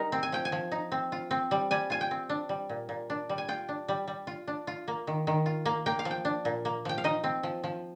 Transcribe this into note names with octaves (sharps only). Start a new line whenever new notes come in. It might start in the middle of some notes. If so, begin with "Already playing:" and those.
Already playing: G3 D#4 A#4
C4
G#5
F3 G5
G#5
F3
D#4
C4
F4
C4
G3
G3 G#5
F4 G#5
G5
C4
D4
G3
A#2
A#2
D4
G3
G#5
F4 G5
D4
G3
G3
F4
D4
F4
A#3
D#3
D#3
F4
A#3
A#3 G5
F5
F3
G5
D4
A#2
A#3
F3 G5
F5
D#4 D#5
C4
F3
F3